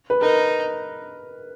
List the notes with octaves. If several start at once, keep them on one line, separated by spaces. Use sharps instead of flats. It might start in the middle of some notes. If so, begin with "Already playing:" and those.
B4
D#4 A#4